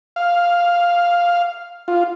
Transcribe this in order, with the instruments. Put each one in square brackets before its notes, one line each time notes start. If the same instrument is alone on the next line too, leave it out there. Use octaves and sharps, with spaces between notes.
[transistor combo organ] F5
F4